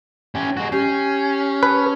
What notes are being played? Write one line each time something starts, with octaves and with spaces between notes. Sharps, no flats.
C#4 G4
G#3 F#4
C#4 G4 G6 C7
B4 A5 C#6 D#6